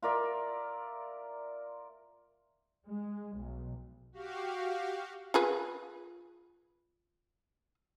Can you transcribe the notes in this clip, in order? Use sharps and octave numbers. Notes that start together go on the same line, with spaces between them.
F4 A#4 D5 E5
G#3
B1
F#4 G4 F5
F4 G#4 B4